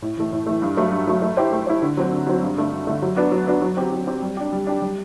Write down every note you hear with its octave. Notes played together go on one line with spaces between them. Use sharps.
A2
E3 A3
A2
E3 A3
G2
F#3 A3
G2
F#3 A3
A3
E4 G4 C5
A3
E4 G4 C5
D3
F#3 C4 F#4
D3
F#3 C4 F#4
G2
D3 A3
G2
D3 A3
F#3
B3 D4 F#4
F#3
B3 D4 F#4
F#3
C4 G4
F#3
C4 G4
G3
D4 G4
G3
D4 G4
G3